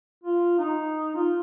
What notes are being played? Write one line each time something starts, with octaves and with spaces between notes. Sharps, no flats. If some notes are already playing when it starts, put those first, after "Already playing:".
F4
D#4
F4